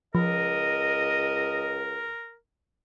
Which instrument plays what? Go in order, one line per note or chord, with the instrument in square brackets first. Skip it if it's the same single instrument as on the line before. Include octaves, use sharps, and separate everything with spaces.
[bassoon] C#2 [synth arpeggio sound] F3 [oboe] A#4 [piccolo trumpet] D#5